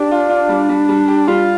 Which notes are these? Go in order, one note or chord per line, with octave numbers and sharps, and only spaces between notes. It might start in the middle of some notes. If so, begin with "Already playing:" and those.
Already playing: D4 G4
F4
F4
G3
G3
G3
G4
G3 F4